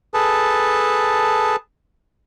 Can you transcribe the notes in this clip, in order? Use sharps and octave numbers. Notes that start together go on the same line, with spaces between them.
G#4 A4 B4 A5